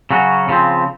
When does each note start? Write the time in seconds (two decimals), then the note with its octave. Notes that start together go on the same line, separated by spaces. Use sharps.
0.11 C#3 F#3 C#4 F#4
0.49 C#3 F3 C4